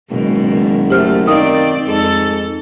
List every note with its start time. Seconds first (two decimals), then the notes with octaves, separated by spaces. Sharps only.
0.10 F#1 G#2 B2 D#3
0.90 F#2 A3 G4 C5 F6
1.27 D#3 C4 D5 F5 D#6
1.87 F2 G#2 A4